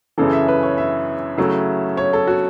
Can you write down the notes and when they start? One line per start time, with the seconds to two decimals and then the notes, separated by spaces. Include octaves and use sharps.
0.18 F#2 C#3 E3 A4
0.33 E5
0.48 B4
0.63 C#5
0.78 E5
1.38 C#3 F#3 A3 E4
1.97 C#5
2.13 A4
2.27 F#4